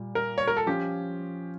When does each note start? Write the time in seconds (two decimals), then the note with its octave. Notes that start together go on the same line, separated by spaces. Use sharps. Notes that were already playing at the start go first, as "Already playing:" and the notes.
Already playing: A#2 G3
0.15 A#4
0.38 C#5
0.47 A#4
0.57 A4
0.66 F3 C#4 F4 G4